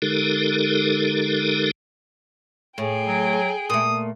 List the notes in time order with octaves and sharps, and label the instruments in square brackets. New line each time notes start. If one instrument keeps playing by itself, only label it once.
[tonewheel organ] D3 G#3 D#4 G4 A4 A#4
[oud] A2 [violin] G#4 G5
[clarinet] F#3
[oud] A#2 A3 [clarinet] D#6